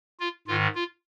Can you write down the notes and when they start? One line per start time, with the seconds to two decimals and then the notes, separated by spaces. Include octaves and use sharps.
0.19 F4
0.47 G#2 D#3 F4
0.75 F4